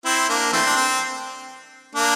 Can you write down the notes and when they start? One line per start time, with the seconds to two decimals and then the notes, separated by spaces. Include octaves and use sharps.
0.05 C4 E4
0.29 A#3 D4
0.53 E3 A3 C4
0.66 D4
0.76 C4
1.95 A#3 D4